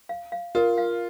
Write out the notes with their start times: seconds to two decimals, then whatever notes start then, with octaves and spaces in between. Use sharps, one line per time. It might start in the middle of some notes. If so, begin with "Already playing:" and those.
0.09 F5
0.32 F5
0.55 F4 A#4
0.78 F5